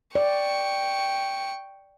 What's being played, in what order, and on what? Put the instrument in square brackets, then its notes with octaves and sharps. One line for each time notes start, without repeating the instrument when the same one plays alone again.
[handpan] D5 [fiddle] G5 C#6